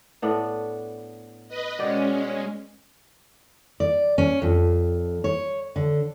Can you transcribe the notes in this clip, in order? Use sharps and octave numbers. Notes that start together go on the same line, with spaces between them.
A2 B3 D4
B4 D#5
B2 G#3 C#4 D5 G5
D5
C#4
F2
C#5
D3